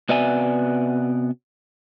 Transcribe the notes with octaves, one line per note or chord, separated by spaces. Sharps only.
C3 B3 F#4 D5 E5 G#5